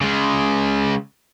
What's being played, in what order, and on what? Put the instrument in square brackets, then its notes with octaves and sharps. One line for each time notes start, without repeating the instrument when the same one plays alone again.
[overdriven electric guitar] C#3 G#3